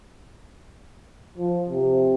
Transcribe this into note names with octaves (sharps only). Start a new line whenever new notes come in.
F3
C3